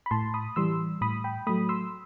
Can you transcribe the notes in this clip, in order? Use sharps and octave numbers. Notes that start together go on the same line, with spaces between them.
B5
A2 A5 C6
B5 D#6
E3 G3 C6 E6
A2 B5 D#6
G5 B5
F#3 A3 B5 D#6
C6 E6